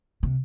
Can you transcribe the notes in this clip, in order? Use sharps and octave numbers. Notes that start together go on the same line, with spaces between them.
C3